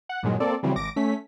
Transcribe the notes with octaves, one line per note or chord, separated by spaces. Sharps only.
F#5
G2 A#2 D#3 F#3 G#3
A#3 C4 A4 D5
C#3 E3 F#3 G3 C4
G#1 D6 A#6 D7
A3 C#4 B6